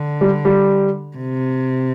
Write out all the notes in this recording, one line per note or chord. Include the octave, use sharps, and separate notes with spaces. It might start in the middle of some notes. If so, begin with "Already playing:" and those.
Already playing: D3
G3
G3
C3